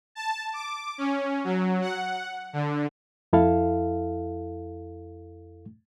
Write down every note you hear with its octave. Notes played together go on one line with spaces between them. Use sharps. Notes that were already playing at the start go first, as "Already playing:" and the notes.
A5
D6
C#4
F#3
F#5
D3
F2 E4 A4 F5